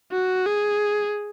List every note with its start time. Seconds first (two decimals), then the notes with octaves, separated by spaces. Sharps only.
0.12 F#4
0.46 G#4